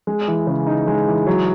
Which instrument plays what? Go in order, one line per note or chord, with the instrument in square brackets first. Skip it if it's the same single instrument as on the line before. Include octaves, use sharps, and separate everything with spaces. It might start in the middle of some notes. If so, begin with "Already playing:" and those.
[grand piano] G#3
E3
C#3
D#4
G#3
E3
F#3